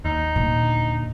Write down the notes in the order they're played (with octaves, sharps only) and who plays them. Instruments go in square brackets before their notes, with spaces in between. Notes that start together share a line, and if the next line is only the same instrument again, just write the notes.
[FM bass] D#2 [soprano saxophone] D#4
[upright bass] A#2 D3